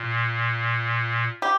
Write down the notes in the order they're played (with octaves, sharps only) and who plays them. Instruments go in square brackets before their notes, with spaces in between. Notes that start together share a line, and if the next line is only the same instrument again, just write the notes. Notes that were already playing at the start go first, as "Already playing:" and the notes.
Already playing: [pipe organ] A#2
[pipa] G4